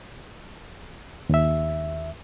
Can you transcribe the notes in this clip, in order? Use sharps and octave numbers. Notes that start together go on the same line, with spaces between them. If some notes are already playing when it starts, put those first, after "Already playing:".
D#2 E5